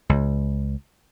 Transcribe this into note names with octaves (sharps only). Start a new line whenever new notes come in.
C#2